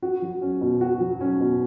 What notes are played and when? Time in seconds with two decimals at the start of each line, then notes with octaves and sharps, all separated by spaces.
0.02 F#4
0.22 F#3
0.42 C#4
0.61 B2
0.81 F#4
1.00 F#3
1.21 C#4
1.40 B2